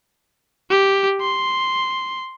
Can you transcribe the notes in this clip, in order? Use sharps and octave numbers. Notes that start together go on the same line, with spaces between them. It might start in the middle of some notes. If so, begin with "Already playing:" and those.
G4
C6